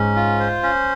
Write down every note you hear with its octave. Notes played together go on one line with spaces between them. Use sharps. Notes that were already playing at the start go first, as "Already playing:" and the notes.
Already playing: G#2 C#4
F4
C5
C#4